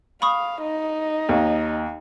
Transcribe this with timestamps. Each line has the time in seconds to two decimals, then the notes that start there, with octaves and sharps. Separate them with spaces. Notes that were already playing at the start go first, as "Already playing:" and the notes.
0.22 F5 B5 C#6 D#6
0.62 D#4
1.29 D#2